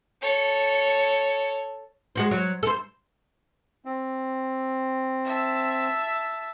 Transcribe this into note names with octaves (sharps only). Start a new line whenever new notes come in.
A4 C#5
G#3 F#4 C5
F#3
A4 C5
C4
E5 A5